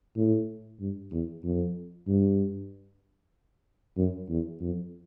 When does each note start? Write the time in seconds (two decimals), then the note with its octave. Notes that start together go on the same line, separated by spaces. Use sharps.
0.17 A2
0.81 G2
1.12 E2
1.44 F2
2.07 G2
3.97 F#2
4.29 E2
4.61 F2